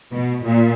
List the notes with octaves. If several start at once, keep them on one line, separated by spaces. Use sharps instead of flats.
B2
A#2